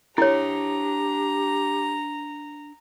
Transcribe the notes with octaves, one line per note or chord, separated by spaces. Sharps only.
D4 E4 G4 C#5 E5 A#5